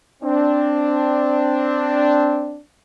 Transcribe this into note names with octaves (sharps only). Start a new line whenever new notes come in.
C4 D4